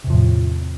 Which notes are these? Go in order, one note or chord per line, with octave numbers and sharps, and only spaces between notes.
E2 A2 C3 F3